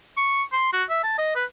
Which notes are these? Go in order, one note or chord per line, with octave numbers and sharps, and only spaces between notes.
C#6
C6
F#4
E5
A5
D#5
B4